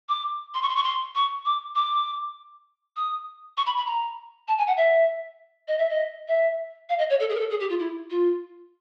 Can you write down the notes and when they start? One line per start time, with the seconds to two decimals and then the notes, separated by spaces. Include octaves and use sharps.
0.09 D6
0.54 C6
0.62 C#6
0.69 C6
0.76 C#6
0.84 C6
1.15 C#6
1.45 D6
1.75 D6
2.96 D#6
3.57 C#6
3.66 B5
3.77 B5
3.86 A#5
4.48 A5
4.58 G#5
4.67 F#5
4.77 E5
5.68 D#5
5.78 E5
5.89 D#5
6.28 E5
6.89 F5
6.98 D#5
7.10 C#5
7.20 A4
7.29 G#4
7.35 A#4
7.39 A4
7.50 G#4
7.60 G4
7.70 F4
7.79 E4
8.10 F4